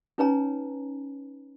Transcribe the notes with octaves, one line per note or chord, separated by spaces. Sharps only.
C#4 D#4 B4 C#5 G#5 A#5